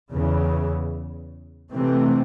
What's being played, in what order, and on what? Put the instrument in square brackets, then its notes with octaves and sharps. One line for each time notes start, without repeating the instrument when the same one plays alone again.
[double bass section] E2 C#3 E3
C3 E3 A3 C4